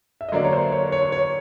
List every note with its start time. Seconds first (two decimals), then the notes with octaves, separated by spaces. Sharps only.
0.21 E5
0.29 D#5
0.32 D3 F#3 A#3 D4 D5
0.44 C#5
0.53 C5
0.72 C#5
0.92 C#5
1.12 C#5